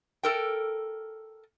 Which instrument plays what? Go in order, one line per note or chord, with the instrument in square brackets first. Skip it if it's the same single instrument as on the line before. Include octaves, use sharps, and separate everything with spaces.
[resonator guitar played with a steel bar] A4 A#4 G5